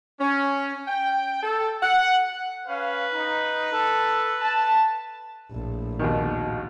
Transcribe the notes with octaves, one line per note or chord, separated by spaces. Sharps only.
C#4
G5
A4
F#5
C#4 B4 F5
D#4
A4
A5
A#1 A2
D#2 B2 D#3